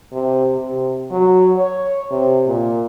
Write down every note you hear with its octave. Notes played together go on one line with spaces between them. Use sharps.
C3
C3
F#3
C#5
C3
A#2